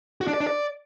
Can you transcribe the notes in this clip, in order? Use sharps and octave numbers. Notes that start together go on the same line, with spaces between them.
F#4
D4
D5
D4
D5